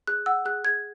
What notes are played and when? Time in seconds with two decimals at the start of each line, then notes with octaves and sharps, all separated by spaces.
0.07 G#4 F#6
0.26 F#5 E6
0.45 G#4 F#6
0.64 G#4 G#6